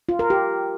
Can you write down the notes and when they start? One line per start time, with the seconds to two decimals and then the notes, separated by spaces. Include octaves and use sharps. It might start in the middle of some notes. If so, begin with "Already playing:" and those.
0.09 F4
0.19 A#4
0.30 G4